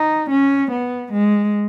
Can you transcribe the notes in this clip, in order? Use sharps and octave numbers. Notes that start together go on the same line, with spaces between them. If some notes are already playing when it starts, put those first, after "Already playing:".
Already playing: D#4
C#4
B3
G#3